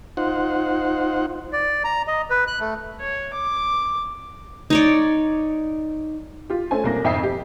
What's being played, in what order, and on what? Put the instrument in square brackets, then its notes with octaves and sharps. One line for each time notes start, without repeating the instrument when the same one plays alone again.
[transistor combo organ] D#4 F4 C5 F#5
[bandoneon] D5
A#5
D#5
B4
F#6
A3
[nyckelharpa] C#5
D6
[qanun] D#4 C#5 D5
[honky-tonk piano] F4 G4
A3 C#4 C5 G#5
C2 A#3 A#6
G#1 F2 E5 G5 D#6 C7
G4